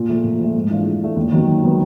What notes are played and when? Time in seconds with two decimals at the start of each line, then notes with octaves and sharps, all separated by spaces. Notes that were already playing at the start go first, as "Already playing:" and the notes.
Already playing: A#2
0.09 F3 A3
0.24 A#2
0.39 F3 A3
0.55 G#2
0.70 E3 A3 D4 F4
0.86 G#2
1.01 E3 A3 D4 F4
1.16 D#2
1.32 D#3 F#3 B3
1.47 D#2
1.62 D#3 F#3 B3